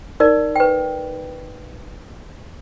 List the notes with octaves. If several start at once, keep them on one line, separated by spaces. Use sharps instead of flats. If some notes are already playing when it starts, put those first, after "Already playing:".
D#4 A#4 D5
B4 G5